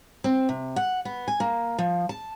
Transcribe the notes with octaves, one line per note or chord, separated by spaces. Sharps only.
C4
C3
F#5
B3
G#5
A#3
F3
A5